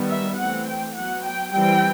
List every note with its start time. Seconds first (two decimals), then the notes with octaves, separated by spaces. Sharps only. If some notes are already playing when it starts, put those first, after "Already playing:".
Already playing: D#3 G3 B3
0.10 E5
0.38 E3 A3 C4 F#5
0.68 G5
0.96 F#3 B3 F#5
1.25 G5
1.53 E3 G3 C4 G5